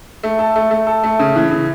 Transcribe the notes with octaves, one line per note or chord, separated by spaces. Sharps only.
A3
A4
A3
A3
A4
A3
C#3
E3
C#3